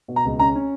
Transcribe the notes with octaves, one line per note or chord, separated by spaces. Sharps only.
B2
A#5
C#2
C#4 A#5
C#4